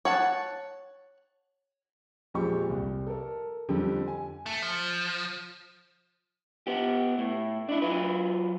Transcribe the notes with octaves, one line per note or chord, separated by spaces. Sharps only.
C#5 F#5 A5
F2 A#2 F3 G#3 G4 C#6
C2
A4 A#4
F2 D3 G3
G#5
A3
F3
B3 G4
A2
D4 E4
F#3 F4 B4